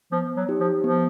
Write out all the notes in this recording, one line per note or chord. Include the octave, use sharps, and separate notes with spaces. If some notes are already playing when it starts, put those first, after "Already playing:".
F3 B3
F#3
D#4 G4
F3
F3 B3